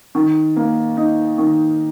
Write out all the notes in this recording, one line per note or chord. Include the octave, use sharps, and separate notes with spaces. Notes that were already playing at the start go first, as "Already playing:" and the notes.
D#3
A#3
D#4
D#3